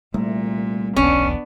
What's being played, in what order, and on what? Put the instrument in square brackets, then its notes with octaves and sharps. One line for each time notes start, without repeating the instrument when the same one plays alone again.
[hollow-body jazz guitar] C2 [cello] A#2 [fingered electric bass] A3 A#3
[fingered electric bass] D#1 B1 E2 [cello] B3 D4 [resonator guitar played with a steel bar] C#4